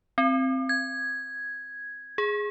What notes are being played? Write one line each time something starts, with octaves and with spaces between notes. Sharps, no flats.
C4
G#6
G#4